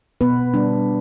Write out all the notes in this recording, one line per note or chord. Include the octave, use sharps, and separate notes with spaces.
B2 B3 B4
G3 D4